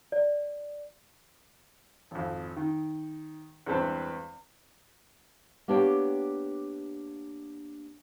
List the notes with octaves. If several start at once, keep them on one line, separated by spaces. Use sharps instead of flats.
D5
G#1 F2
D#3
E2 G2 G#3 C4 B4 A5
A#3 B3 D4 G4 C#5 G5